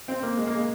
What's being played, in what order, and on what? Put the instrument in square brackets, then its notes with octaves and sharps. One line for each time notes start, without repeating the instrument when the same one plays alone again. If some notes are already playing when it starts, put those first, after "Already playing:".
[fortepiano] C4
A#3
G#3
A#3
G#3